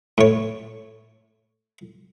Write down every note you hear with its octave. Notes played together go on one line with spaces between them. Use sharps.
A2 C#5